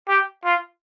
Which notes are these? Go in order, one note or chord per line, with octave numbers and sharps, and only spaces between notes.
G4
F4